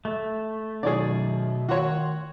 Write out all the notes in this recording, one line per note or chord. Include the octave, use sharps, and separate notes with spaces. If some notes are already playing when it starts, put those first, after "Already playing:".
A3
F#2 B2 D#3 G#4 C#5 D5
D#3 F#4 C#5 F#5 C6